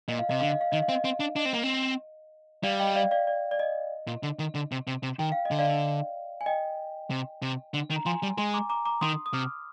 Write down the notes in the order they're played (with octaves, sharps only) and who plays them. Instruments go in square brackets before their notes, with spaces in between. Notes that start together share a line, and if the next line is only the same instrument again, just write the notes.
[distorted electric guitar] A#2 [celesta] D#5
[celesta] F5
[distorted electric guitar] C3 [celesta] D#5
[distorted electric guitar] D3 [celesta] F5
[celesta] D#5
F5
[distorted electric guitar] D#3 [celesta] D#5
[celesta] F5
[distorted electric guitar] C4
[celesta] D#5
[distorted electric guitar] C4
D4
[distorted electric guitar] D4 [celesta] D#5
[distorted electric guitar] C4
A#3
C4
[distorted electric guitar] G3 [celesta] D5 F5
[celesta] D#5 G5
D5 F5
D5 F5
D5
D5
D#5
[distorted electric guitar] A#2
D3
D#3
D3
C3
C3
C3
[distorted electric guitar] D#3 [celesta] G5
[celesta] F5
D#5
[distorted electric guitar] D3
[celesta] D5 F5
G#5
D#5 G5
[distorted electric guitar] C3
C3
D3
D#3
[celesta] A#5
[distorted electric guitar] F3 [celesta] G#5 C6
[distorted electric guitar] G3
[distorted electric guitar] G#3 [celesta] G#5 C6
[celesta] A#5 D6
A#5 D6
A#5 D6
[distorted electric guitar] D#3 [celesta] C6 D#6
[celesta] D#6
[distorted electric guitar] C3 [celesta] D6 F6